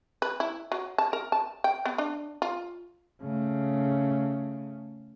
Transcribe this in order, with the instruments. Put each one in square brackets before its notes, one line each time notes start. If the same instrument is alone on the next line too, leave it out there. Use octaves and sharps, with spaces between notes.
[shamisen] B4
E4
F#3
A5
A#4
A5
G5
B3
D4
F4
[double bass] C#3 A3